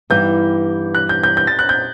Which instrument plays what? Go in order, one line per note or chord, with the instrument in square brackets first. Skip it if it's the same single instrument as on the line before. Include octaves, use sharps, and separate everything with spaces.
[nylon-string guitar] G2 E3 G3 B3 D#4 [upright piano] G6
[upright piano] F#6
G6
G6
G6
A6
F#6
G6